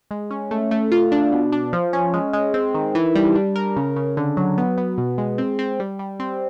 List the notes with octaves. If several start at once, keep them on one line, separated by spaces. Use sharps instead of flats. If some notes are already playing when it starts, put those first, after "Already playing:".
G#3
C#4
A3
A3
F4
D4
B2
D4
F3
C#4
G#3
G#3
C4
D#3
E3
G3
D4
A#4
C#3
C#3
D3
F#3
B3
B3
B2
G#3
C4
C4
G3
G3
C4